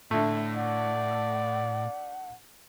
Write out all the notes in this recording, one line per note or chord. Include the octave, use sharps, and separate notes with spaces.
A2 D3 A3 E5
D5 F#5